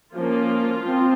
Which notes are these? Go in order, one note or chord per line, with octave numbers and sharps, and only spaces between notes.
F3 A#3 C#4 F4
F3 C4